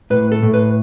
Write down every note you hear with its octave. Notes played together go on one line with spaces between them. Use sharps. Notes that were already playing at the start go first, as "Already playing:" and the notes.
A2 B4
A4
A2
B4